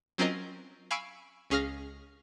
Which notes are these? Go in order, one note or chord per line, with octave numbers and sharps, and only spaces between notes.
F#3 C4 C#4 F4 A#4 D#5
F5 G#5 B5 C#6 E6 D7
C#2 C#4 G#4 F5 F6 A#6